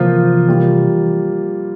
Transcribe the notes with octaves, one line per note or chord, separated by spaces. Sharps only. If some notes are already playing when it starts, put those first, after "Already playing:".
Already playing: C3 E3 F3 A#3 F4 C5
G3 A#3 F4